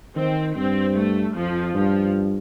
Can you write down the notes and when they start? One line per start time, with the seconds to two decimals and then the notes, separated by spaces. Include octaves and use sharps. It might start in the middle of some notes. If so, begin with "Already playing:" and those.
0.16 D#3 C4
0.55 G2 C4
0.95 A3
1.34 F2 F3
1.74 G2 F3